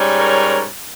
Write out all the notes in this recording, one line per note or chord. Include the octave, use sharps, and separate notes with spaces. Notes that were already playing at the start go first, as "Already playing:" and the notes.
Already playing: G#2 G3 C#4
A#4 C#5